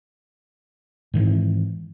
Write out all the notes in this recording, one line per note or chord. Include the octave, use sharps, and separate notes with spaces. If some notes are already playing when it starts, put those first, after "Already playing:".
G#2 D#3 E3 C4